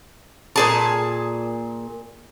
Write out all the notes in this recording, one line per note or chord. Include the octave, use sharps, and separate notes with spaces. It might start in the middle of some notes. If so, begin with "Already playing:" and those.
A#2 G#4 A5